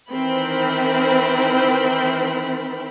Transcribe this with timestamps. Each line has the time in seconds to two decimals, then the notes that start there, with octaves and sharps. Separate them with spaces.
0.11 D#3 E3 C4 A#4 C5 B5